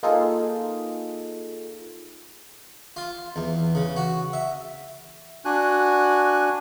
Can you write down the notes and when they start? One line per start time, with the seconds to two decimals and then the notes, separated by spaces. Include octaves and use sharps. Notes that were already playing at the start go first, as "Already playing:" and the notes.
0.03 A#3 D#4 F4 G#4 A4
2.97 F4
3.36 E2
3.75 C#3
3.96 F#4
4.33 E5
5.45 D4 F#4 G#5 F#6